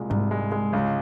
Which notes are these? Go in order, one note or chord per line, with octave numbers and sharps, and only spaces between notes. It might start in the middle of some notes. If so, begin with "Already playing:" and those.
Already playing: C2 A#2 G#3
C2 G#2
G#3
G#3
C#2